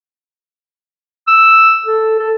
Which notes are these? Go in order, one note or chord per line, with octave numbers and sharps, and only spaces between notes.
E6
A4
A4